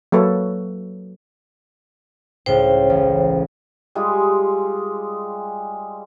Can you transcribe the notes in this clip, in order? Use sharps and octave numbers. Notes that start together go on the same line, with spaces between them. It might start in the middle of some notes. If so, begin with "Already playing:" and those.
F#3 A#3 A4 B4 C#5
C#2 A2 C5 G5
A1
G3 G#3 F4 G#4